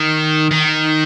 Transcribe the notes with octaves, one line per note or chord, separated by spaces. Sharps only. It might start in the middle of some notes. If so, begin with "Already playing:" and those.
Already playing: D#3
D#3